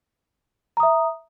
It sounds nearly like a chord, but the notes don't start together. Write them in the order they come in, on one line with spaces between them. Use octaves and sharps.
A#5 D#6 E5